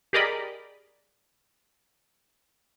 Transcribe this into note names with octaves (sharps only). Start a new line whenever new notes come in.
G4 G#4 A#4 D5 D#5 B5